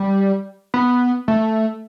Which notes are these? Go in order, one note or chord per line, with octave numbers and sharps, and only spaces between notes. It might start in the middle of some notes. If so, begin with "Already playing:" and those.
Already playing: G3
B3
A3